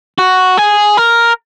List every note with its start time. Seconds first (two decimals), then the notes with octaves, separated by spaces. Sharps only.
0.18 F#4
0.57 G#4
0.97 A#4